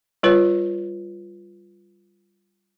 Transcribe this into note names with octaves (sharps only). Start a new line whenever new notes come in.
G3 F4 B4 C#5